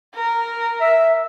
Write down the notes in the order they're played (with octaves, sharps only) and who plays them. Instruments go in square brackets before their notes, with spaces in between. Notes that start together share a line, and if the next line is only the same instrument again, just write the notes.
[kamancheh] A#4
[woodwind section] E5